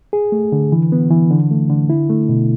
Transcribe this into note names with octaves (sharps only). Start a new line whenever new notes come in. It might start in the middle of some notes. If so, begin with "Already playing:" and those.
G#4
A3
D3
E3
B3
E3
D3
A3
D3
E4
A3
B2